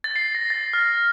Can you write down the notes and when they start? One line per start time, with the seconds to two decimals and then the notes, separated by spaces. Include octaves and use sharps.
0.04 A6
0.16 C7
0.35 A#6
0.50 A6
0.73 F6